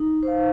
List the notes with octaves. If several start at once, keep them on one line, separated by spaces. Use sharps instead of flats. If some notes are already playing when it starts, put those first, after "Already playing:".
Already playing: D#4
C5 F5